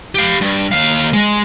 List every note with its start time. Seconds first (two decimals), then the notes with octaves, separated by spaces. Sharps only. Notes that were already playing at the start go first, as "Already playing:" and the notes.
0.15 G4 F5
0.41 G2
0.71 D#2 F5
1.13 G#3